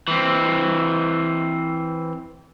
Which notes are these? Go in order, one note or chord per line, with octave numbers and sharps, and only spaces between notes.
E3 C4